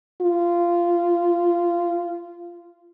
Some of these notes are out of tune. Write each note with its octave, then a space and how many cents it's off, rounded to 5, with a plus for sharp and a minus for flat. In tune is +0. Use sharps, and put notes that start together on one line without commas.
F4 -15